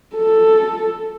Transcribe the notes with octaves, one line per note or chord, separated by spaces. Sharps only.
A4